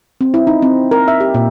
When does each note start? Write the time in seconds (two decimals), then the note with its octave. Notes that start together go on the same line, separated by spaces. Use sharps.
0.21 C4
0.34 E4
0.47 D#4
0.62 C4
0.91 A#4
1.08 E5
1.20 G4
1.35 A#2